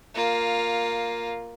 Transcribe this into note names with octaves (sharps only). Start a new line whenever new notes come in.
A#3 F4